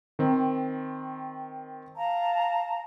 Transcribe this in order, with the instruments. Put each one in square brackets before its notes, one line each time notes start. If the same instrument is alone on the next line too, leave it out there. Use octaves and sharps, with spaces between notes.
[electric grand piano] D#3 C4
[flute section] F5 A5 A#5